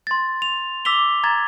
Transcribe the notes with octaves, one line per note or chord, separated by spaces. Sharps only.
C6 A6
F7
D6 E6 B6 F7 G7
A#5 G#6 A6